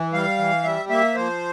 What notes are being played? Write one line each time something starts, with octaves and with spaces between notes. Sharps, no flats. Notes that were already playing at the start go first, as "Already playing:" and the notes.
Already playing: E3
G3 F5
E3
G3 E5
A#3 E5
F3 C5